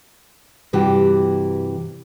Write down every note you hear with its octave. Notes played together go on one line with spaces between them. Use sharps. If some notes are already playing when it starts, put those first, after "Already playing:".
G2 C3 E3 F#4 G4